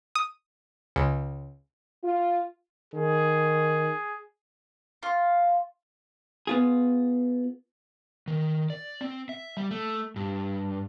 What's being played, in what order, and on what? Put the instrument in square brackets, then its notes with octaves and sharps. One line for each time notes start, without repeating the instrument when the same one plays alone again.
[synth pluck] D#6
C#2
[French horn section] F4
[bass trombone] D#3 [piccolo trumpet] G#4
[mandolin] F4
[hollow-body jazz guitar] B3 F4 G#4
[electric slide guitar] D#3
D5
C4
E5
G3
A3
G2